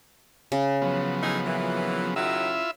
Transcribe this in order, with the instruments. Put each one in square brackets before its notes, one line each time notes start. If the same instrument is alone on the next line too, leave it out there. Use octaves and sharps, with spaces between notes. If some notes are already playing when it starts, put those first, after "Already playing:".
[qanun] C#3
[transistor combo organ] F3 F#3 B3
[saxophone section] A2 D#4 G#4
A#2 E3
[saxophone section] D#3 F#3 [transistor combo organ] E4 F4 E5